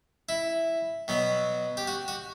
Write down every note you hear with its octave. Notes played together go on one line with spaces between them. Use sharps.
E4
B2 F#3 B3
G4
F#4
F#4